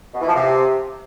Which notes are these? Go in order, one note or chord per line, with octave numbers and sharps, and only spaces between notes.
B2
E3
F3
C3